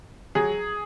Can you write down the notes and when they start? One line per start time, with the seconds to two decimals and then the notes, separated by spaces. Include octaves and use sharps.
0.35 F#3 G#4